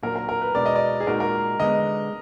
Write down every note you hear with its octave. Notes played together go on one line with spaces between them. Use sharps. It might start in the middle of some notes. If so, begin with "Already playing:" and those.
A#2 F#3 A#3 D4 A#4
A#4
A#4
B4
B2 G#3 D4 F#4 D5
D#5
D5
G#4
A#2 G#3 D#4 F#4 A#4
A#4
D3 G#3 B3 D#5